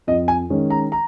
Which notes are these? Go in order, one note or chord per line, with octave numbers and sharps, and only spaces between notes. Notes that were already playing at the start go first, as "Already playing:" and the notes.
F2 D#5
G#5
D#3 G#3 C#4
A#5
A#5